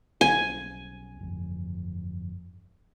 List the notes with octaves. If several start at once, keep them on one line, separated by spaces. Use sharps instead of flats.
B1 G3 C#4 G#5
G1 F2